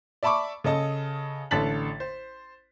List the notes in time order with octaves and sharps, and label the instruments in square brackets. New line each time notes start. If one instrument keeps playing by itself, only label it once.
[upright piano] D5 E5 A5 B5 C#6 D6
C#3 A4 D#5 A5 D#6
A1 D3 A5 A6 B6 F#7
C5